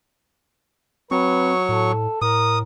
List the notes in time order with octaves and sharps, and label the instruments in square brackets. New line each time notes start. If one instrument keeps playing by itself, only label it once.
[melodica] F#3 C#6 [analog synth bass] C4 [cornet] B4
[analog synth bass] A2 [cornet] A4
[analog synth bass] A2 [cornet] A#4 [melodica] D#6